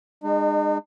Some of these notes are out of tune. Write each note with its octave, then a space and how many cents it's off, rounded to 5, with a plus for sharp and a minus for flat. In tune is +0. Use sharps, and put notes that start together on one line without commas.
G#3 -25 D#4 -45